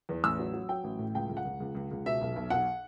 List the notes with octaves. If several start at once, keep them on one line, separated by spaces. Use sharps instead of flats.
E2
A1 E6
F#3
F#3
F#3 G5
A1
A2
C#2 G5
C#2
F#5
C#2
C#2
C#2
C#2
B2 E5
B1
B1
B1 F#5